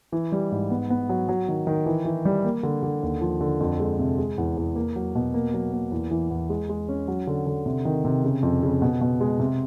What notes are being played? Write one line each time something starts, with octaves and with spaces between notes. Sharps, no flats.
E3
G3
G#2
B3
B3
F#3
F#3
D#3
D#3
E3
E3
G3
A#3
D3
D3
D#2
F3
D3
F2
G#3
C3
G#3
E2
E2
A#3
F#3
B2
A#3
F#3
A#3
E2
E3
E2
G#3
G#3
C#4
F#3
D3
D3
C3
D#3
C3
C#3
F2
C#3
B2
B2
G#3
C3